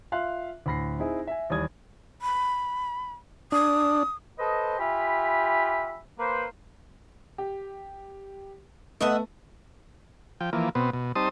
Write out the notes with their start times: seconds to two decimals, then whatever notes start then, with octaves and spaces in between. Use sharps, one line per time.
0.12 F4 E5 F5 C6 F#6
0.66 D2 A2 B5 A#6 C7
0.99 C4 D#4 E4 G#4
1.27 E5 G#5
1.50 D#2 E3 G3 D5 D#6 G#6
2.22 B5
3.52 D4 D#6
4.39 A4 B4 C5 D#5
4.79 F4 G4 E5 G#5 B5
6.19 A#3 B4 C5
7.38 G4
9.01 A3 B3 D#5 E5 F#5
10.41 F3 G5
10.53 E3 F3 A#3
10.75 B2 B3 C4
10.93 B2
11.16 G3 C4 D#4 C5 A5 D#6